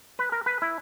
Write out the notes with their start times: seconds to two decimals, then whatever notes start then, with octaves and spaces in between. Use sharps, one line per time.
0.19 B4
0.32 A#4
0.46 B4
0.62 E4